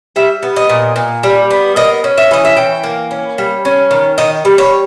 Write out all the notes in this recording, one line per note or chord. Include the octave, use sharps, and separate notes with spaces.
G3 E5
B3
D#5
A#2
A#2
G3
B3
A#3 D#5
C#4
E5
E3 D#5
E5
E3 G5
A#3
C#4
G3
C#4
D#3
D#3 D#5
G3
C#5